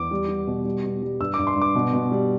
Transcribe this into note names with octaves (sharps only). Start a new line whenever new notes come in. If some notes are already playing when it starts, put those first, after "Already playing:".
Already playing: E2 D6
G3
G3
B2
G3
B2
G3
G2 E6
G2 D6
C6
G2
D6
B2
B2
G3